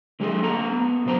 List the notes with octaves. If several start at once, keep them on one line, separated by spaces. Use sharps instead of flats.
D3 G#3 F4 F#4 G#4 A4
A#3 A4 A#5
B3
B2 F#3 C5 A#5